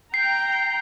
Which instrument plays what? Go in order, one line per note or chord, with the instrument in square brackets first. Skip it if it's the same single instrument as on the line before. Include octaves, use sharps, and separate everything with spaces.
[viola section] G5 A#5 [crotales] C7